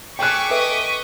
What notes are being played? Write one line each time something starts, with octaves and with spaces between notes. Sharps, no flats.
G#4 A4 G5 C#6 D6 F#6 B6
A4 B4 D#5 E5